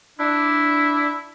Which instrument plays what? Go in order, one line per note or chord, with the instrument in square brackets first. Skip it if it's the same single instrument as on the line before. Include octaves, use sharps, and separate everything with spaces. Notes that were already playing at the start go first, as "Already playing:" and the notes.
[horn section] D4 [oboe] E4